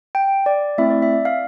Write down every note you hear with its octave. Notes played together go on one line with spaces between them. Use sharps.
G5
D5
A3 C4 E4 E5
D5
E5
F5